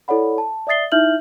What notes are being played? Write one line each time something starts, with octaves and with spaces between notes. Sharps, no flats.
E4 A4 C#5 D5 F#5 B5
A5
D5 E5 D#6 A6 C7 G7
D#4 E4 E5 F6 G6 F#7